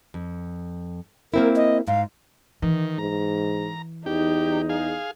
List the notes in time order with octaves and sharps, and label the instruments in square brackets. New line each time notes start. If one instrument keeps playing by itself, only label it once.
[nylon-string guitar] F2
[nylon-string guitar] A#3 C4 E4 [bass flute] A#4
[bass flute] D#5
[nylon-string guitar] G#2 [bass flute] F5
[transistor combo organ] D#3 [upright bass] E3
[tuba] G#2 [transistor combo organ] A#5
[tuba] E2 [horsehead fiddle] D#4 [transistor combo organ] G4
[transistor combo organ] G#4 F5